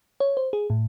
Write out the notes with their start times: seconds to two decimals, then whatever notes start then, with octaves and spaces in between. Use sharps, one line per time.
0.20 C#5
0.37 C5
0.53 G#4
0.70 A2